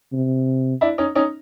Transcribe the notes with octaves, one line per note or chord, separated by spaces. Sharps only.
C3
D4 E4
C#4 D#4
C#4 D#4